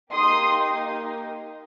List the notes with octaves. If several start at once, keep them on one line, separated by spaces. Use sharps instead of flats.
A#3 D#4 G4 C6 D#6